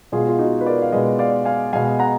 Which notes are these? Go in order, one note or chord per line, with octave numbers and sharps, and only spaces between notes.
B2 G#3 F4 G#4
F4
D#4 F#4
B4
A#4 D5
F5
B2 G#3 B4 D#5
D5 F5
F5 G#5
B2 G#3 F5 G#5
F#5 A#5